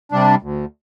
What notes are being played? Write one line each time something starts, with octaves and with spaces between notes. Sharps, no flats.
C3 G3 D4
D2